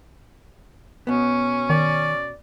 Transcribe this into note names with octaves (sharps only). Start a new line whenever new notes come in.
B2 B3 C#4
D#3 D5